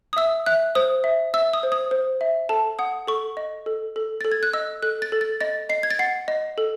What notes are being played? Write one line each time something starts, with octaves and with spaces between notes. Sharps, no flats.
D#6
E5 E6
E5 F#6
C5 D#6
E5
E5 E6
D#6
C5
D#6
C5
E5
A4 A5
F#5 D#6
A4 C#6
D#5
A4
A4
A4 A6
G#6
F#6
D#5 E6
A4 F#6
A6
A4
A6
D#5 A6
D#5 C7
G#6
A6
F#5 C7
D#5
A4